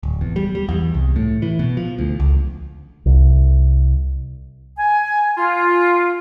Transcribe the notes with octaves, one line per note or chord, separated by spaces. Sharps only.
D1
E2
G3
G3
E2
C2
A2
E3
B2
F3
D2
C#2
C2
G#5
F4